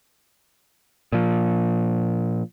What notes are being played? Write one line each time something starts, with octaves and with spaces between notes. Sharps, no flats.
A#2 F3